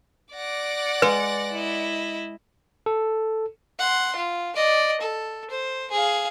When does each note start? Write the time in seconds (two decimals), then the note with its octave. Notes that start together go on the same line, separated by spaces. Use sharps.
0.34 D5 F#5 D6 A#6
1.02 G#3 B4
1.52 E4 D#5
2.86 A4
3.79 F#5 C6
4.16 F4
4.56 D5 D#5
5.01 A4
5.50 C5
5.91 G#4 F5